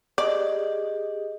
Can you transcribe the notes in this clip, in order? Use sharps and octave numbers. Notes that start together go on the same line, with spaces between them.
G4 G#4 D5 D#5